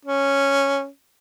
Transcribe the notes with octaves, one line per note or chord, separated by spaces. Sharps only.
C#4